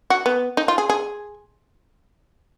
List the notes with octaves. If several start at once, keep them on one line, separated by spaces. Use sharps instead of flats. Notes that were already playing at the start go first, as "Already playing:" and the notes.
F#4
B3
D#4
F4
G#4
G#4